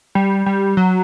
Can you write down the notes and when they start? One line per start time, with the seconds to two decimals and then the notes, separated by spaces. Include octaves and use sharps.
0.15 G3
0.46 G3
0.77 F#3